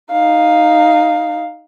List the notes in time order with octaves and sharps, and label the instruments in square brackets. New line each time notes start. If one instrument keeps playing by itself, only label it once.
[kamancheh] D#4 F5